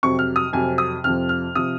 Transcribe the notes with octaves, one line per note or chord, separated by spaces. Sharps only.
F2 C3 F#3 C#6
F6
D#6
F2 C3 F#3 G#5
D#6
F2 C3 F3 F6
F6
C3 F3 D#6